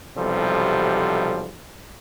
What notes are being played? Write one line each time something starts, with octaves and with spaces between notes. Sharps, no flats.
B1 E2 C3 F3 G3 A4